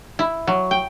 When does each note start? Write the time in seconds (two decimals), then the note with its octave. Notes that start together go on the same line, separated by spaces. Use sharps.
0.19 E4
0.47 F#3
0.71 G5